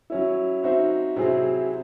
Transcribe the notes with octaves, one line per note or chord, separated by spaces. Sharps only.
F#3 C#4 E4
C4 D#4 F#4 C5 E5
C3 F#3 C4 E4 G#4